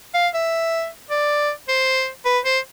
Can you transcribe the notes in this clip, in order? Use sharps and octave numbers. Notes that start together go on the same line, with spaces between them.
F5
E5
D5
C5
B4
C5